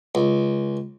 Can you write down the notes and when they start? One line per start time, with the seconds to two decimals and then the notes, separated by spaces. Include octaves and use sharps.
0.15 C#2